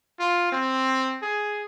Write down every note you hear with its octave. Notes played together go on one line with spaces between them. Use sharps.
F4
C4
G#4